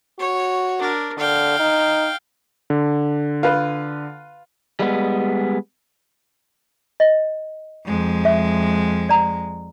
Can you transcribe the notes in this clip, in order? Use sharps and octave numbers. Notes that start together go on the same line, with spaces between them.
F#4 C#5
D4 A#4
D3 F5 G5
D#4
D3
F4 B4
G3 G#3 B3
D#5
F2 G#3
E5
D5 A#5